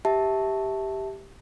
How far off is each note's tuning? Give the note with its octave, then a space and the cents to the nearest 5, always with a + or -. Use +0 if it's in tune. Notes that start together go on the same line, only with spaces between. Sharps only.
G4 +0 E5 -15 A5 +0